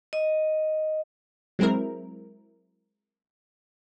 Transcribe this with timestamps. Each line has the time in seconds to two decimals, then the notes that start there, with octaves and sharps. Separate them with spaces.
0.13 D#5
1.59 F#3 G#3 C4 E4 A#4